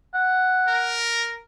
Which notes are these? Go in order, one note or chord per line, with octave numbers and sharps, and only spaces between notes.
F#5
A#4